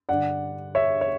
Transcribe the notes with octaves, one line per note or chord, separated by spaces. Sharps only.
G2 D3 D5 F#5
C#5 E5
C#5